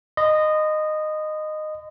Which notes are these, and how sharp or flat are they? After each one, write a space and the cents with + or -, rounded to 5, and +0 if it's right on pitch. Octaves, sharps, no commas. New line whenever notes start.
D#5 -15 C6 -45